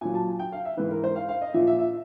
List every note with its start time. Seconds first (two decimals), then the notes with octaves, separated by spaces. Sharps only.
0.01 A#2 F#3 G#5
0.14 A5
0.39 G5
0.52 F5
0.65 E5
0.77 G#2 E3 B4
0.91 A#4
1.04 C5
1.16 F5
1.29 F5
1.41 D#5
1.54 A#2 F3 E5
1.67 E5
1.79 E5